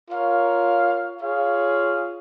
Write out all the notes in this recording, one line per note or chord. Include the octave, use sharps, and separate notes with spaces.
F4 A#4 C#5 F5
F4 G#4 C#5 F5